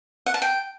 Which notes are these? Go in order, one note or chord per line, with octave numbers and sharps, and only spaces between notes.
F#5
A5
G5